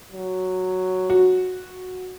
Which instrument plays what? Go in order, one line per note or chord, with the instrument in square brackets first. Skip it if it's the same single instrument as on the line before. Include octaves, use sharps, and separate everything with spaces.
[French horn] F#3
[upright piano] F#4